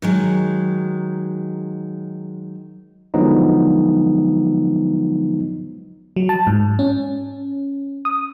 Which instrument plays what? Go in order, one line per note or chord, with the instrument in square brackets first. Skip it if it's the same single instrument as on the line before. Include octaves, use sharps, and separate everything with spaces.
[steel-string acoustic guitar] D#3 F#3 G#3
[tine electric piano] D3 F3 F#3 G#3 B3 D#4
[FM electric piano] F#3
A5
G#2
C#4
D#6